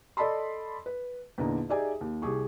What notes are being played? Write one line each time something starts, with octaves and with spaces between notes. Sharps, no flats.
A4 D5 D#5 A5 B5 C6
B4
E2 A#2 D3 D#4 A#5
D#4 G4 G#4 D5 E5 G#5
D#2
C2 G4 G#4 C#6